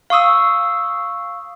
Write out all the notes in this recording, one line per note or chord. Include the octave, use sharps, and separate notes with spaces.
F5 C#6 D#6 E6